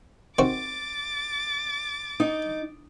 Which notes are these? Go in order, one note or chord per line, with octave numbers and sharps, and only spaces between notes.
D#3 C4 F#4 D6 A6
D#4